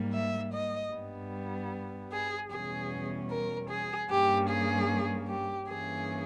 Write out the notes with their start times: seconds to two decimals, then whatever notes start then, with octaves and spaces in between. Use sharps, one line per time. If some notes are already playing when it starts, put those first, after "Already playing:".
Already playing: G#2 G3 A#3
0.14 E5
0.54 D#5
0.93 G2 G3 B3
2.12 G#4
2.51 E2 B2 G3 C#4 G#4
3.31 A#4
3.70 G#4
4.10 G2 G3 A#3 C#4 G4
4.50 G#4
5.29 G4
5.68 G2 E3 A#3 C#4 G#4